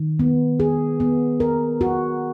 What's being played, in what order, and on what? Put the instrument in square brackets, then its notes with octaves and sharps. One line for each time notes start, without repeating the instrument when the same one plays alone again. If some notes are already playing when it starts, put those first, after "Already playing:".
Already playing: [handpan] D#3
B3
G#4
B3
A#4
F#4